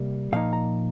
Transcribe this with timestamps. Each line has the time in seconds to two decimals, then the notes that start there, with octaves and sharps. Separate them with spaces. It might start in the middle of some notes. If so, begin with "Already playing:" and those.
Already playing: C3 G3 A#3
0.32 A#2 F3 A#3 D#4 F5
0.53 A#5